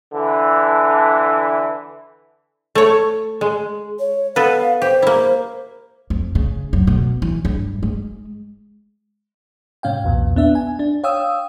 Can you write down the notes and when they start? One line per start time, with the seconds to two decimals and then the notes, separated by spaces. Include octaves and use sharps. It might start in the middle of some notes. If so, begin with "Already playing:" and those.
0.12 D3 E3
2.75 A3 C#5
3.41 G#3
3.99 C#5
4.36 B3 A4 B4 F5
4.82 G4 C5
5.02 A#3 E4
6.10 F2
6.35 C#3
6.73 F#2
6.87 B2
7.22 E3
7.45 G2
7.83 G#3
9.83 G#2 C3 C#4 F5 G5
10.04 B1 E2 A#2
10.36 B3 D4 E5
10.55 G#5
10.79 D4
11.04 C#5 F5 G5 D#6 E6